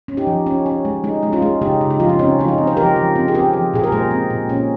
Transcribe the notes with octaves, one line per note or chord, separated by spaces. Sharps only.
C#4
D#4 G4
F3
C#4
C#4
G#3
G#3 D#4
G#3
C#4 F4
G#3
C#3 D#4 G4
C#3
D#4
F3 F4
D#4
C4 C#4
F3 F4
D#4
C4
C5
F3 G4 A#4
F3
C4
G#4
C4 G4 A#4
F3
A#2 G#4
A#4
G#3 G#4 C5
C4
A#2
C#4